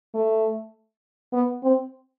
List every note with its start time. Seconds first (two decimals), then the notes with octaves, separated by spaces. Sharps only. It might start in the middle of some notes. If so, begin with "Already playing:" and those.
0.15 A3
1.33 B3
1.63 C4